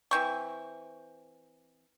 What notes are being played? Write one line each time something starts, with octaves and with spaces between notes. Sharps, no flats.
E3 C4 C#6